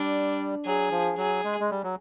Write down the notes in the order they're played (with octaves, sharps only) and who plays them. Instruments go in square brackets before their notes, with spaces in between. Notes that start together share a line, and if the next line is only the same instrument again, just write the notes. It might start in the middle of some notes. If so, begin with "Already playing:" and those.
Already playing: [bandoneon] G3 [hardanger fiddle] D4
[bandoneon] F#3 [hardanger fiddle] G#4
[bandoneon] F3
[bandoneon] F#3 [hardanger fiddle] G#4
[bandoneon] G#3
G#3
G3
F#3